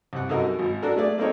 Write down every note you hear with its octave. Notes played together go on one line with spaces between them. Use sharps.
C2 F#5
C2 F#2 D#4 A4 A#4
G#1
D4 F#4 A4 A#4
A3 G#4 D5
A#3 C4 D#4 A4 C#5